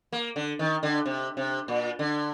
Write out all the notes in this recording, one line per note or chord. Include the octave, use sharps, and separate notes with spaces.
A#3
D3
D#3
D3
C3
C3
A#2
D3